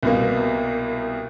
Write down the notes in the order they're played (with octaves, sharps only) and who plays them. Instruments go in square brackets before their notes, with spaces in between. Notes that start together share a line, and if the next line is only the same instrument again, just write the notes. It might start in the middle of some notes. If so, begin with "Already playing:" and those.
[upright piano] C2 B2 A#3